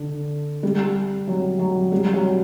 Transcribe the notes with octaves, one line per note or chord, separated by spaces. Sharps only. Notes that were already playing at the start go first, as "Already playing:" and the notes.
Already playing: D3
G3
F#3
F#3
G3
F#3